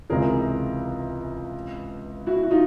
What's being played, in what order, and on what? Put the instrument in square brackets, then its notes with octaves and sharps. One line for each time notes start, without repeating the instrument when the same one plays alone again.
[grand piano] C#2 C3 E3 [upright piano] G#4 A#4
[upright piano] E4 F#4
F#4
D#4 F4